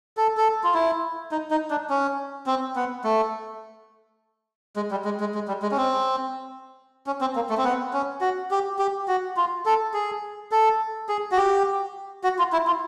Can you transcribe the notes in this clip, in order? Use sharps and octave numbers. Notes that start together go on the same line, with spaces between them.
A4
A4
F4
E4
D#4
D#4
D4
C#4
C4
B3
A3
G#3
G3
G#3
G#3
G#3
G3
G#3
C#4
C4
C#4
C4
A#3
A3
C4
B3
C#4
F#4
G4
G4
F#4
F4
A4
G#4
A4
G#4
F#4
G4
F#4
F4
E4
F4